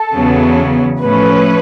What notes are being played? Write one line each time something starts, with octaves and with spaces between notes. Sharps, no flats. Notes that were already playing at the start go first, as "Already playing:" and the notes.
Already playing: A4
E2 C#3 F#3 B3
A2 F3 A3 C#4 B4